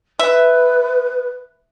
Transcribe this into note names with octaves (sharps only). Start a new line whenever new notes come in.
B4 E5